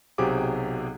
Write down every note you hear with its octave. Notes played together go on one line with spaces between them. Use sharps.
B1 C3 F#3 G4 G#4 D6